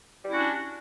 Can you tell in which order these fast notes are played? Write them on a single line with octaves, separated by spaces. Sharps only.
G3 E4 C#4 F#4 D4